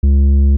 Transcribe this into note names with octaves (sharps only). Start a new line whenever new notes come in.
C#2